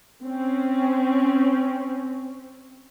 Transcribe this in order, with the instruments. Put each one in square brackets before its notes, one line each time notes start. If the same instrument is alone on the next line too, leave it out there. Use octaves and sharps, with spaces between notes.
[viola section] C4 C#4